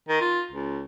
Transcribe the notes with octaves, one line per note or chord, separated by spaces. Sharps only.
D#3
F4
C#2